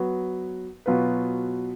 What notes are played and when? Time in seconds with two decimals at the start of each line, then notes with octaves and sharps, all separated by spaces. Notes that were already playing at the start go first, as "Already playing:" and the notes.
Already playing: F#3 B3 F#4 B4
0.86 B2 F#3 B3 F4 B4